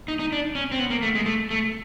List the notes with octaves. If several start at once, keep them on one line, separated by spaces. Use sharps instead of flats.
D#4
D#4
D4
C#4
C4
B3
A#3
A3
G#3
A3
A3